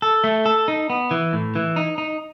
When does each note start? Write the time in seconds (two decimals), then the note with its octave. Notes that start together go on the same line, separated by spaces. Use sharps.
0.02 A4
0.24 A3
0.46 A4
0.68 D#4
0.90 B3
1.11 E3
1.33 A2
1.55 E3
1.76 D#4
1.98 D#4